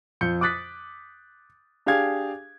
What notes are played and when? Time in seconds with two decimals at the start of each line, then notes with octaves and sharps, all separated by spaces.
0.21 F2 G6 C#7
0.41 D6 D#6 F#6 A6 B6
1.86 D4 G4 G#4 F5 G#6